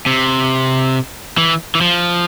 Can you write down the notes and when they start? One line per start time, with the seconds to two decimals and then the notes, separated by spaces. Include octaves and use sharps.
0.06 C3
1.38 E3
1.75 E3
1.81 F3